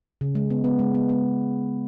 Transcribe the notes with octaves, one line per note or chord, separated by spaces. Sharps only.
C#3
G#3
B3
B3
G#3
B3
B3